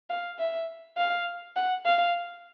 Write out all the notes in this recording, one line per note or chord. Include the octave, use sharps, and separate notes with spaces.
F5
E5
F5
F#5
F5